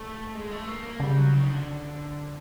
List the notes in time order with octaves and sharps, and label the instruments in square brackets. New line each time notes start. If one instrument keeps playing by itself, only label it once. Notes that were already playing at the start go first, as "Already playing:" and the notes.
Already playing: [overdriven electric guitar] A3
G#3
A3
A#3
A#3
[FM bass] C#3 [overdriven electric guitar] G3
[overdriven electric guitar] F#3
D#3
C#3
D3